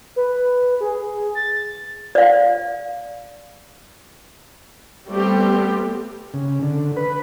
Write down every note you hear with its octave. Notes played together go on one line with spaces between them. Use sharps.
B4
G#4
A6
D5 F5
G3 A3 B3 C4 G4
C#3
D3
B4